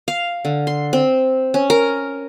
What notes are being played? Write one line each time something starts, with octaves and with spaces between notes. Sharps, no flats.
F5
D3
C6
C4
C#4
A#4